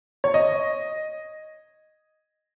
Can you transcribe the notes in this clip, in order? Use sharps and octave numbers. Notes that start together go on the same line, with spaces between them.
C#5
D#5